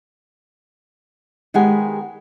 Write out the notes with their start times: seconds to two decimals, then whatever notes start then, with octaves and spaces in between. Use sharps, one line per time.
1.54 D#3 G#3 B3 G4 F#5 G#5